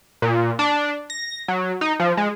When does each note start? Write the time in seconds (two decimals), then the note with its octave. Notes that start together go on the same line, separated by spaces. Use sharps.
0.22 A#2
0.59 D4
1.10 A#6
1.48 F#3
1.81 D#4
2.00 F3
2.17 G#3